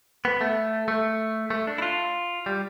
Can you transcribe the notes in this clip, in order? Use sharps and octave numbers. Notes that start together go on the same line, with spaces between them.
B3
A3
A3
A3
D4
E4
F4
G3